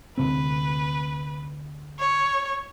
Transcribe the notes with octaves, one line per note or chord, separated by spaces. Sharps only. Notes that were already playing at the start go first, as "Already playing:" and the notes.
D2 C3 C4 B4
C#5